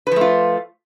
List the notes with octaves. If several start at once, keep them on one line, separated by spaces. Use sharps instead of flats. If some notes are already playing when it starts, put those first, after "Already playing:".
F3 A3 F4 B4